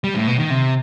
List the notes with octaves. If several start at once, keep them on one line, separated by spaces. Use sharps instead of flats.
G3
A2
B2
D#3
C3